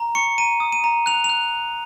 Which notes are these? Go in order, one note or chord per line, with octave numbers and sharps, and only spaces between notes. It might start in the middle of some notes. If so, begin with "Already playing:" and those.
Already playing: A#5
C#6 C#7
A#5 D#7
D#6
D#7
A#5
F#6 F7
F7
F#6